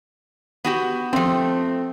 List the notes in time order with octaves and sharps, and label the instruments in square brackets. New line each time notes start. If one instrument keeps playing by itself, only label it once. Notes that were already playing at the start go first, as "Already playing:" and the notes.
[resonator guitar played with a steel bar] B3 F#4 G4
[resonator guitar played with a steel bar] F3 A3 [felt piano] C4